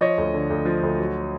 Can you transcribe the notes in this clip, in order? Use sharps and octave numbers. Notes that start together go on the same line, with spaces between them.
F3 C#5 D#5
D2
D3
D2
F3
D2
F#3